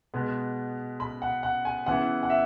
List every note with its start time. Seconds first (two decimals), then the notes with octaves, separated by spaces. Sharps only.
0.14 B2 G#3 B3
1.00 B5
1.22 F#5
1.43 F#5
1.65 G#5
1.86 C#3 E3 B3 E4 F#5
2.23 F#5
2.30 E5